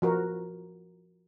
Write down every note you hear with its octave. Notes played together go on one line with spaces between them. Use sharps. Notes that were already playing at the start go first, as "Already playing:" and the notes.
F3 F#4 A#4